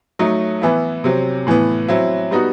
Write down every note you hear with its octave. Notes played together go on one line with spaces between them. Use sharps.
F#3 A3 D#4
E3 B3 E4
C3 F#3 C4
A2 E3 B3
F#3 C4 E4
G3 B3 D#4 F#4